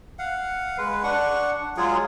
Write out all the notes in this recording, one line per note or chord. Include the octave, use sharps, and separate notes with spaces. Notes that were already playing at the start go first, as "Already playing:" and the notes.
F5 F#5
G#3 B4
D4 F#5 C#6
F#3 G#3 F4 G#4